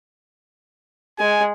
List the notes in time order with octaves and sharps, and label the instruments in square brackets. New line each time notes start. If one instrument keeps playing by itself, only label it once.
[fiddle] G#3 [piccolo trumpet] G#5